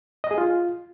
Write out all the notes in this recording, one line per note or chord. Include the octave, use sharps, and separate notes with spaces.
D#5
G#4
F4